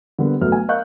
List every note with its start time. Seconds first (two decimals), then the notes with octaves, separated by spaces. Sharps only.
0.19 D3 G3 A#3 B3
0.40 G1 F#3 A3 B4 F6
0.52 G#5
0.69 A#4 D#5 F5 C#6 F#6 G6